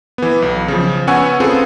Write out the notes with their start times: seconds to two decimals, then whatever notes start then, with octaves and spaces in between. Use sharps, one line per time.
0.18 E3 B3
0.42 B1
0.68 C#3 F3
1.07 B3 C#4 F#5 G#5 C#6 E6
1.40 B3 C4 F4 G#4 A4